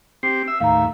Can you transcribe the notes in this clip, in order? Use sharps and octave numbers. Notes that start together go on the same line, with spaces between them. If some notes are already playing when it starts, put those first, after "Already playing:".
C4 G4 C7
E5 E6
D#2 A2 E5 F5 A#5